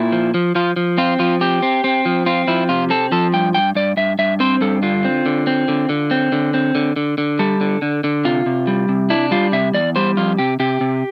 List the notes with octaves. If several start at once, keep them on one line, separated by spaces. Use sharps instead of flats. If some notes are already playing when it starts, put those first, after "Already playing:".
Already playing: A#2 E4
F3
F3
F3 F4
F3
C4 F4
F3 F4
C4 G4
C4
C4
F3
C4 F4
F3 E4
C3 F4
C4 A4
F3 A4
G2 G5
G2 G5
G2 D5
G2 E5
G2 E5
C4 C5
G2 A4
D3 F4
C4
D3
C4
D3
D3
C4
D3
C4
D3
D3
D3
G3 A4
D3
D3
D3
C3 F4
C3
G3
C3
D4 E4
G3 F4
C3 E5
E2 D5
G3 C5
F2 F4
C3 G4
C3 G4
C3